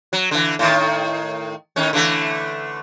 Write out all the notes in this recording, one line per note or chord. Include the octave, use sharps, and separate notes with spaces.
F#3
D3 E3
A2 D#3
A2 D#3 C#4
D3 E3 A3